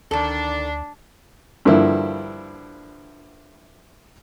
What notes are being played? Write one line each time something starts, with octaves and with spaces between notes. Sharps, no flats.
D2 D#3 D4 A4
G2 D3 F3 A#3 E4